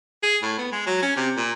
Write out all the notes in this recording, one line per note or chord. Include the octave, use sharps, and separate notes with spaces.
G#4
A2
B3
G#3
F#3
C#4
C3
A#2